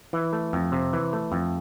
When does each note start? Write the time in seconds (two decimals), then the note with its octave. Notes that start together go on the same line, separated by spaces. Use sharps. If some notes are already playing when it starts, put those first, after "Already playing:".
0.13 E3
0.33 A3
0.53 F2
0.72 C3
0.93 E3
1.13 A3
1.32 F2